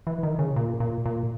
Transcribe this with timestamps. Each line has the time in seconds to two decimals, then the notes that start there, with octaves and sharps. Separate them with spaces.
0.07 E3
0.23 D#3
0.39 C#3
0.56 A#2
0.80 A#2
1.06 A#2